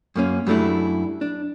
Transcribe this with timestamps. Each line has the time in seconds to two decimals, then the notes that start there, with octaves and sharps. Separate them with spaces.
0.16 F#2 A#3 C#4
0.47 F#2 G3 A3 D4 E4
1.21 D4